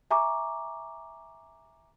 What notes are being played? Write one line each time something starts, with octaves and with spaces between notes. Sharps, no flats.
E5 G#5 A#5 C#6 D6